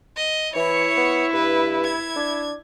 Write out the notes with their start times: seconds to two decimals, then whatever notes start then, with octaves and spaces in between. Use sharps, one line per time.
0.17 D#5
0.56 E3 E4 C#5 C#6
0.97 B3
1.33 G2 B4
1.84 G#6
2.16 D4